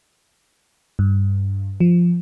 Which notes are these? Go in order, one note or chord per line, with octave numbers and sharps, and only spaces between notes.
G2
F3